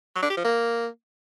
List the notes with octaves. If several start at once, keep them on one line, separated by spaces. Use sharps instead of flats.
F#3
D4
G4
F3
A#3